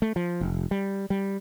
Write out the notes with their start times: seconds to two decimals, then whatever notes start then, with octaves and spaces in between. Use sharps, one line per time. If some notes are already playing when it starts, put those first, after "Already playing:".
0.02 A3
0.16 F3
0.41 F1
0.71 G3
1.10 G3